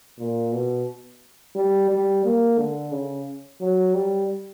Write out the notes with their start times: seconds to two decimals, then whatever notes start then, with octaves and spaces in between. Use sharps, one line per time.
0.19 A#2
0.52 B2
1.56 G3
1.89 G3
2.24 A#3
2.58 D3
2.92 C#3
3.61 F#3
3.95 G3